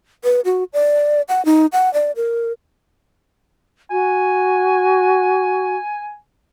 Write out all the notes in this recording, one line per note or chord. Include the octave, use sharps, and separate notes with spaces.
B4
F#4
D5
F#5
D#4
F#5
D5
A#4
F#4 G#5